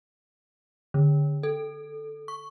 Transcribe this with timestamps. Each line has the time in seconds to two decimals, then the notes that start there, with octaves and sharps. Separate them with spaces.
0.94 D3
1.43 A4
2.28 C#6